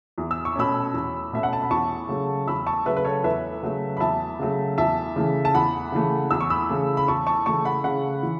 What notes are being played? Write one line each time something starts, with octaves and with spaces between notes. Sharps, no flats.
E2
E6
C#6
B2 A3 C#4 B5 E6
E2
B2 A3 C#4 E5
F#5
A5
B5
E2 A5 C#6
C#3 F#3 A3
E2 B5 E6
A5 C#6
C#3 F#3 A3 B4 E5
B4
A4 C#5
E2 B4 E5
C#3 F#3 A3
B5
E2 E5 A5
C#3 F#3 A3
E2 E5 A5
C#3 E3 A3
A5
E2 F#5 B5
C#3 E3 A3
E2 E6
C#6
B5 E6
C#3 E3 A3
B5
E2 A5 C#6
A5 C#6
C#3 E3 A3 A5 C#6
F#5 B5
C#3 F#5 B5
E3